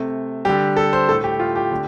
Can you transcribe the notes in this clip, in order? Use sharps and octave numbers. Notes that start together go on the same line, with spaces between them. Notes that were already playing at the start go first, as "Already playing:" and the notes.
Already playing: C3 A3
D3 G3 G4
A4
C5
A2 A3 A4
G4
F4
G4
D3 A3